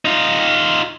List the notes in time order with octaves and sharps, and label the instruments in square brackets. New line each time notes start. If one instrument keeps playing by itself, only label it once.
[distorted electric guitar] D#4 F4